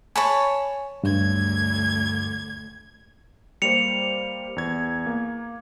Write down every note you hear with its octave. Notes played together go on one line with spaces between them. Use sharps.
C#5 G#5 A5 B5
D2 G2 G#6
G3 A#3 C5 C#7 F7
E2 G#6
A#3